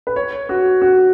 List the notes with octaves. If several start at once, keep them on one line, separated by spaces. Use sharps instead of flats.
B4
C#5
F#4
F#4